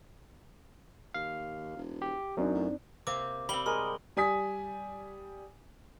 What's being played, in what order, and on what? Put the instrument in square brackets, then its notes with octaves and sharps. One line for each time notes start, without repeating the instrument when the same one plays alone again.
[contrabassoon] D#2 [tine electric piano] F5
[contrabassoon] E1
[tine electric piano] G4
[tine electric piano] F#2 [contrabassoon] F#3 [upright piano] C4 D4 D#4
[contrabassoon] A2
[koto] C3 A#3 C4 [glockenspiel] D6
[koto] G3 C4 [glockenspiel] B5 F#7 G7
[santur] G#3 A#4 D#6 [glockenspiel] C6
[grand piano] G3 G#5 D#6 B6